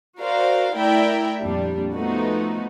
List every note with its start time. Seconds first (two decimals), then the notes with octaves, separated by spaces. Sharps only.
0.21 F#4 A#4 C5 D5 F5
0.75 A3 E4 A#4 D5 E5 G5
1.41 F2 A#2 G3 D4
1.95 F3 A3 B3 D#4 F#4